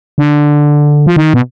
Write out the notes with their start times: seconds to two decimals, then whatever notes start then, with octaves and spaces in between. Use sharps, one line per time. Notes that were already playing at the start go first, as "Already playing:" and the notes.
0.18 D3
1.07 F3
1.16 D#3
1.34 B2